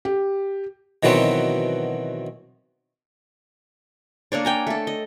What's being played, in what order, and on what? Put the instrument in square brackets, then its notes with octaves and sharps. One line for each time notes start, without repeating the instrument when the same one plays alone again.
[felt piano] G4
[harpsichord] B2 D#3 E3 F#3 B3 C4
[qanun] A#3 D4 C#5 D5
G5 G#5 A#5
A3 A4
D#5